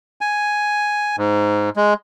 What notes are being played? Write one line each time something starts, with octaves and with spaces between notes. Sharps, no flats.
G#5
G#2
G#3